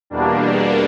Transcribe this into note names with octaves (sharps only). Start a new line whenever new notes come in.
E2 B2 G3 A#3 D4